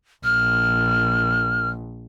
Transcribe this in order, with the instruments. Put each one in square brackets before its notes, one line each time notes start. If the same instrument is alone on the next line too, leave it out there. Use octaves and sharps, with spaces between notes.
[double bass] A#1 [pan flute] F6